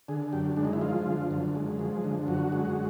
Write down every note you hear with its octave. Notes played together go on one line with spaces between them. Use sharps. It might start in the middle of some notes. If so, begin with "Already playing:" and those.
D3 G#4
F#2 G4
G#3 D4
D#4
E4
F3 F4
D3
F#2
G#3
F3
D3
F#2 F#4
G#3